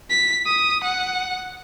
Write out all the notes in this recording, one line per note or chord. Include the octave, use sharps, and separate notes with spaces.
B6
D#6
F#5